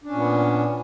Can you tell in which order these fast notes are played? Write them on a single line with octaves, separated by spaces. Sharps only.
D4 C#4 A#2 B3